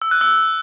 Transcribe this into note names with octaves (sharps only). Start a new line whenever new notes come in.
E6
F#6
E6